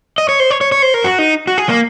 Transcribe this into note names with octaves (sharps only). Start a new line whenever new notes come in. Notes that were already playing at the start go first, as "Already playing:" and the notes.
D#5
C#5
C5
C#5
C#5
C#5
C5
A#4
F#4
D#4
F#4
G#4
A#3